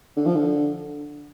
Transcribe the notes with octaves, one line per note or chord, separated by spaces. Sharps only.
D3
F3
D3